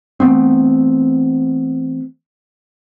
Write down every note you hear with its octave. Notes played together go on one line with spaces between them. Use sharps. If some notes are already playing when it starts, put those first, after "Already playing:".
E3 A3 B3 C4